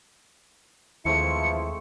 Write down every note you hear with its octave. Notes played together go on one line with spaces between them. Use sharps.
D#2 E3 F3 G#3 A3 C4 E4 C#7